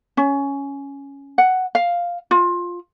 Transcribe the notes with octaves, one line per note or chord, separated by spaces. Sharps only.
C#4
F#5
F5
F4